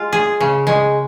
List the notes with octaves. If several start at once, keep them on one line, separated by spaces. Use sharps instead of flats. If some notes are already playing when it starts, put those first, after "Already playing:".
Already playing: G#3 F4
G#4
C#3
G#3